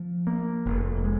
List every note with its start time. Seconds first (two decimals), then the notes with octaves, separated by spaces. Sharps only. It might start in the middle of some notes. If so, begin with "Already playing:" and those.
Already playing: F3
0.27 A#3
0.65 F1
1.04 G#3